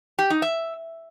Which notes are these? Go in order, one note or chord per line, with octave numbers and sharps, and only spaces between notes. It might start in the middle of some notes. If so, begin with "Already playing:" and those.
G4
D#4
E5